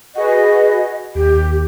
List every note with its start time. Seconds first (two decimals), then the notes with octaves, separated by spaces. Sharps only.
0.15 F#4 G#4 B4 D#5
1.15 D#2 G4